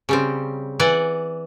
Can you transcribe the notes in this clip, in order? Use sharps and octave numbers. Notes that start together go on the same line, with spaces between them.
C#3 G3 C4
E3 D5 F#5 G#5